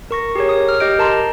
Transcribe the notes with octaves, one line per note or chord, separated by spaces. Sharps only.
A#4 C#6 A#6
G4 G#4 A#4 C#5
D#6
F6
G4 D#5 G6 D7
A#4 A5 A#5 C6